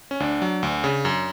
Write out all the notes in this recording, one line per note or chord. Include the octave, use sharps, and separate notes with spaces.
C#4
D2 D4
F#3
D2
C#3
F#2